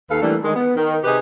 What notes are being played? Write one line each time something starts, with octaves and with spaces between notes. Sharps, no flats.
D#2 A4 B4 F5
E3 G3 A3 A#3 D4
D#3 G#3
B3
D#3
C3 D#4 G4 G#4 B4